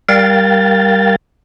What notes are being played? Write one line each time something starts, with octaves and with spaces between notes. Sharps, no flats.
G3 A#4 F5 G5 A6